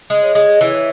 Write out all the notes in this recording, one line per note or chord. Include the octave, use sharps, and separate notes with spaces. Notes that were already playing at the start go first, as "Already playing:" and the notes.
G#3
C#5
G#3
E3